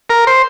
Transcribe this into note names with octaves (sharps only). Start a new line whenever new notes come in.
A#4
C5